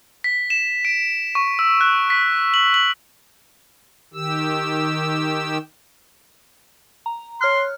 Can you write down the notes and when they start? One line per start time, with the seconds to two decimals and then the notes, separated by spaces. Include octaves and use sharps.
0.24 B6
0.50 E7
0.85 D7
1.35 C#6
1.59 E6
1.81 F#6
2.10 B6
2.54 F#7
2.74 F#7
4.14 D#3 G4 E6
7.06 A#5
7.41 C#5 C6 F6 F#6